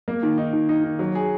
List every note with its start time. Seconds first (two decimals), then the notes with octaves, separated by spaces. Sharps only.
0.08 A#3
0.23 D#3
0.38 D#4
0.53 D#3
0.69 D#4
0.84 D#3
0.99 F#3
1.15 G#4